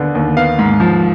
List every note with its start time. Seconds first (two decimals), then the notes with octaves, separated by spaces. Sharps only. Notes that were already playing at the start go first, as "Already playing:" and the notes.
Already playing: D#2 D3 B3
0.15 D#2
0.37 B3 F5
0.59 G#2
0.80 F3